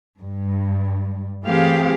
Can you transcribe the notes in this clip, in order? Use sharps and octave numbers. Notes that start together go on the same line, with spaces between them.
G2
E3 A3 C4 G4 G#4 F5